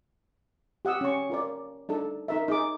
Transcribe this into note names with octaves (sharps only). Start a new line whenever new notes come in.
G4 F#5 D#6 E6
C#4 C#6
F4 A#4 D5
D4 D#4 A4
D#4 A#4 E5
D#4 G#4 D6